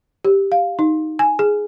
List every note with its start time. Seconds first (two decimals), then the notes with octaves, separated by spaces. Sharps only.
0.25 G4
0.52 F5
0.79 D#4
1.19 G#5
1.39 G#4